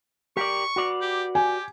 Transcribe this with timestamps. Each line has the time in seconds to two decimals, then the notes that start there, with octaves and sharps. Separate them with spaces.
0.37 G4 A#4 D5 C#6
0.76 F#4 B4 D5
1.01 G4
1.35 G4 G#5